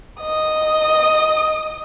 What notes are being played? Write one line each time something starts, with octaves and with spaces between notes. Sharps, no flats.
D#5 D#6